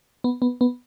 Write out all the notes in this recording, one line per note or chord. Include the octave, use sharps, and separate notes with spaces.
B3
B3
B3